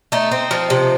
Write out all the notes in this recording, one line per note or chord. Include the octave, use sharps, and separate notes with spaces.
A3 D#4
C4
F3
C3